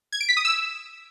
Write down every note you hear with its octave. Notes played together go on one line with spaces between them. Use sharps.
G#6
D7
B6
D#6
E6